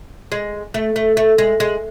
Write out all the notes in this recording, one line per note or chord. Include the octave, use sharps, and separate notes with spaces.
G#3
A3
A3
A3
G#3
G#3